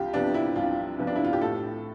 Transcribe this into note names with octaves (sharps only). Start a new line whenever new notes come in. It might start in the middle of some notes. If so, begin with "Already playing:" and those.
Already playing: C2 F4 G4
C3 F3 B3 D4
E4
C2 F4
C3 F3 B3
D4
E4
F4
G4
A2 A4